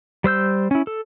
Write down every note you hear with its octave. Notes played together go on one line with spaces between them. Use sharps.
G3 C5 E6 G6
C#4 E4
A4